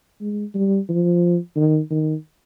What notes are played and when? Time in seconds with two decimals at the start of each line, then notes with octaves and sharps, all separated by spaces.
0.21 G#3
0.55 G3
0.89 F3
1.56 D#3
1.91 D#3